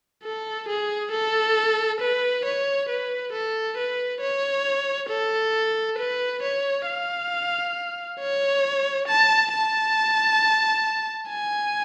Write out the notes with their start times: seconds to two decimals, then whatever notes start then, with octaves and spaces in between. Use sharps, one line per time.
0.23 A4
0.68 G#4
1.12 A4
2.01 B4
2.45 C#5
2.89 B4
3.33 A4
3.78 B4
4.21 C#5
5.09 A4
5.98 B4
6.42 C#5
6.87 F5
8.20 C#5
9.08 A5
9.52 A5
11.30 G#5